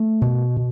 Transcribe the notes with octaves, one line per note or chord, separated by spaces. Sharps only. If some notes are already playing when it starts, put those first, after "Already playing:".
Already playing: A3
B2
B2